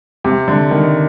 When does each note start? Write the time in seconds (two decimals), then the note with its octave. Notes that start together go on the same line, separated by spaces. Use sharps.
0.24 C3
0.48 D3
0.71 D#3